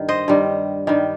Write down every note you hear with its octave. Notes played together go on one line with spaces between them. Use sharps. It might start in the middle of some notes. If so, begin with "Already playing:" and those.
Already playing: G2 D#3
C5 D#5
G2 D#3 G3
G2 D#3 G3